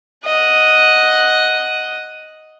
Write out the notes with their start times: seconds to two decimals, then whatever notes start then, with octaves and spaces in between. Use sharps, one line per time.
0.24 D#5 F#5